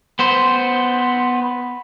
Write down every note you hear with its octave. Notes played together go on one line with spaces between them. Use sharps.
B3 C5